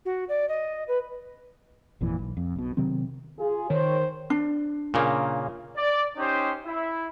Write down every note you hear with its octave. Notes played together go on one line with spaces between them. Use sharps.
F#4
D5
D#5
B4
G#1 F2 A#2 E3
B1
F2
B1 B2
C3 D#3 F#3 C4
F4 G#4
D#3 C5 C#5
D4
A#2 C#3 A#3
D5
C#4 D#4 G4 C5
E4